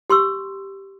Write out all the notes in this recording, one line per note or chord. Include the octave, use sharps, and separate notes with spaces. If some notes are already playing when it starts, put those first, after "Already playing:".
G4 C6 C#6 E6